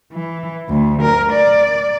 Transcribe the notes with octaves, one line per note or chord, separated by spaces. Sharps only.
E3
D2
A#4
D5